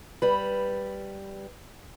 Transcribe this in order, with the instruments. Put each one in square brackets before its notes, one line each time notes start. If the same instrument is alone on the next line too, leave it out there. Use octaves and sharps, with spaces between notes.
[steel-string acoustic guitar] G3 B4